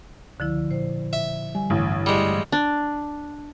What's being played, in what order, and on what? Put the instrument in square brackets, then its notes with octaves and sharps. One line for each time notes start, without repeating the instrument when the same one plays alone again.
[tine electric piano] C#2 [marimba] D3 F3 E4
[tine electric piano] A#2 [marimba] C5
[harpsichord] E5
[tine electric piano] G3 [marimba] G#5
[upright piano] A1 [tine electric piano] G2 D3
[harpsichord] G3 G#3
[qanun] D4